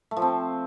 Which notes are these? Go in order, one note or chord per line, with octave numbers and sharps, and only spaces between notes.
A3
F3
C4